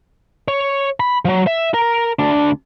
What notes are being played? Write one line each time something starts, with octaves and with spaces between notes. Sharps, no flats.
C#5
B5
F3 F#3
E5
A#4
D2 D4